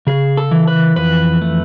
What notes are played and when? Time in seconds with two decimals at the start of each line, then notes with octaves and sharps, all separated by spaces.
0.07 C#3 G#4
0.37 A4
0.51 E3
0.68 B4
0.96 F2 B4
1.41 A3